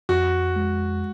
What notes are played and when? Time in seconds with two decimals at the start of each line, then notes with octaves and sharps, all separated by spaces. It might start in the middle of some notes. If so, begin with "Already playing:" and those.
0.09 F2 F#4
0.56 G#3